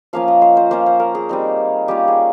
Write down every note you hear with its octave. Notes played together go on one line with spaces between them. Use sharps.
F3 A#3 C#4 F4 F5
D#5
C5
C5
A#3 C#4 F4 C5
C5
A#4
G#4
G3 C4 D#4
G3 A#3 C#4 F4 G4
G#4